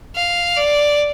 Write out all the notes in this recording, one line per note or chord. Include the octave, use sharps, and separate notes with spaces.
F5
D5